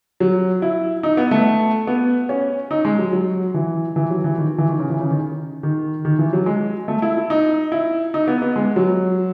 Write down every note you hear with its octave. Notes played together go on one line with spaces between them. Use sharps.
F#3
E4
D#4
B3
A3
B3
C#4
D#4
G#3
F#3
F#3
E3
E3
F#3
E3
D#3
E3
D#3
C#3
E3
C#3
D#3
D#3
D#3
E3
F#3
G#3
A3
E4
E4
D#4
E4
D#4
B3
B3
G#3
F#3